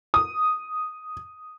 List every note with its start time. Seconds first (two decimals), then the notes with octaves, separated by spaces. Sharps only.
0.14 D#6